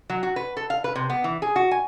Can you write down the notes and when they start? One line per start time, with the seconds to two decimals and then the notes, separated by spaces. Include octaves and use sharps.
0.10 F#3
0.23 F#4
0.36 B4
0.57 A4
0.70 F5
0.84 B4
0.95 C3
1.10 B3
1.24 E3
1.42 G#4
1.56 F#4
1.71 G#5